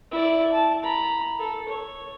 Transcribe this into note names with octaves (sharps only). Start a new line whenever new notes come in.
E4 D5
A5
A#5 B5
A4
C#5